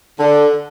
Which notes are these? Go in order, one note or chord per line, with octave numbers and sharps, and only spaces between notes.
D3